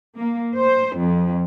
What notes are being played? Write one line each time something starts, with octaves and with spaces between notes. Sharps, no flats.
A#3
C5
F2